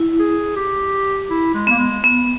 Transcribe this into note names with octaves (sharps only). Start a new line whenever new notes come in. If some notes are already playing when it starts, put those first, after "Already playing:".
Already playing: E4
G#4
G4
E4
G#3
A#3 B3
G#3
B3